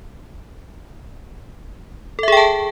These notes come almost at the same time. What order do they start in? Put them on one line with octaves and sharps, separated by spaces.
A4 E5 G#4 G5 A5